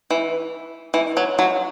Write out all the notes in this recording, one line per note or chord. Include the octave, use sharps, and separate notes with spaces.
E3
E3
F#3
F#3